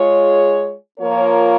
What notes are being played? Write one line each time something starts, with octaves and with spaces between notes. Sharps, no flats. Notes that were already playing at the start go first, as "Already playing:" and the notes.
Already playing: G#3 F4 G#4 C#5
F3 A#3 F4 A#4 C#5